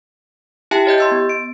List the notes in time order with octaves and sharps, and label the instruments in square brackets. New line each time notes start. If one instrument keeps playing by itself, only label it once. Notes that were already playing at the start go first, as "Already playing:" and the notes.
[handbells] E4 G4 E5 G5 A5
G4 C#5 D#5 G6
C6 E6 A6
B3
D7